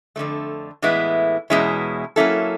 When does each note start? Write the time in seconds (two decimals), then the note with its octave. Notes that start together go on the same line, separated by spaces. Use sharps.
0.16 F2 D3 F3 A3
0.82 A2 E3 G#3 B3 E4
1.50 E2 B2 G#3 C#4 E4
2.16 F#3 A#3 C#4 E4 A4